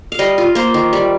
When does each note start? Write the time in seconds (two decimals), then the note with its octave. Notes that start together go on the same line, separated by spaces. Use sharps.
0.12 F5
0.19 G3 D#5
0.38 F4
0.55 A#3 C5
0.74 D#3
0.93 G3